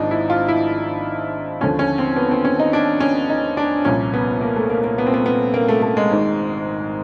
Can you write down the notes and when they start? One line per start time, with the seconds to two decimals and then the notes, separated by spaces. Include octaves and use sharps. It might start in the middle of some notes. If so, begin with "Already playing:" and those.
Already playing: G#1 G#2 F3 D4 D#4
0.11 E4
0.30 F4
0.48 E4
1.61 D#2 D3 F3 C#4
1.79 C#4
1.98 C4
2.16 B3
2.31 C4
2.45 C#4
2.60 D#4
2.73 D4
3.00 C#4
3.29 D#4
3.57 D4
3.85 C2 A#2 F3 C#4
4.14 B3
4.41 A#3
4.56 A3
4.70 A#3
4.84 A#3
4.98 B3
5.06 C4
5.14 B3
5.26 B3
5.54 A#3
5.68 A3
5.82 A3
5.97 G#3
6.10 G#1 G#2 D#3